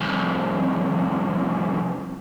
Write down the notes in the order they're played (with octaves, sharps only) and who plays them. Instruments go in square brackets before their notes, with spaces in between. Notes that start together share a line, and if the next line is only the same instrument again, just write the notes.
[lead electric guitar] C2 F2